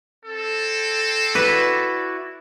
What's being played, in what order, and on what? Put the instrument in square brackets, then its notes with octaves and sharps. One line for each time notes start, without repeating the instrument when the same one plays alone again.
[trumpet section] C4 A4
[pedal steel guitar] E4 F#4 D5 [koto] B4